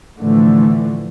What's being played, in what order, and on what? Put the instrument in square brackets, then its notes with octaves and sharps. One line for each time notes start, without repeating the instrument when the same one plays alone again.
[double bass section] A2 D3 E3 F3 A3